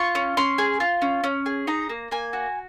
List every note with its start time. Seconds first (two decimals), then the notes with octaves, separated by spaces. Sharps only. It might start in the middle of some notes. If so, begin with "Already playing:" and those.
Already playing: F4 C#6
0.15 C#4
0.37 C#4 C6
0.58 G#4
0.80 F4
1.02 C#4
1.24 C#4
1.46 G#4
1.67 D#4 A#5
1.89 A#3
2.11 A#3 G#5
2.33 F#4